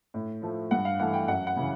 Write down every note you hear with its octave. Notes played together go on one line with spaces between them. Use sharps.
A2
F3 A3
G2 F#5
F5
E3 A3 F#5
G5
F#2 F#5
F#5
C#3 E3